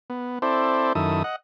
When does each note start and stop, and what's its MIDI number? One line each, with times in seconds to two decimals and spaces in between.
0.10 0.39 59
0.42 0.93 60
0.42 0.93 64
0.42 0.93 69
0.42 0.93 72
0.42 0.93 74
0.95 1.23 42
0.95 1.23 51
0.95 1.23 64
0.95 1.23 69
0.95 1.23 87
1.24 1.36 75
1.24 1.36 78